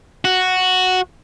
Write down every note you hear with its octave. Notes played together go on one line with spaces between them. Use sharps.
F#4